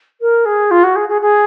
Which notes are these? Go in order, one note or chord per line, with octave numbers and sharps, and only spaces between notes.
A#4
G#4
F4
F#4
G#4
G#4
G#4